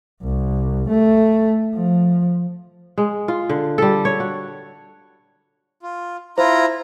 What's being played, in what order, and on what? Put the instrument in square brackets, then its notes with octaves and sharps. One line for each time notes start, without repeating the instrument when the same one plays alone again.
[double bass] C2
A3
F3
[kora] G#3
F4
D3
G3 A4
C#5
F#4
[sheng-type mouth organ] F4
[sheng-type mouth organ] E4 F4 A#5 [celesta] C5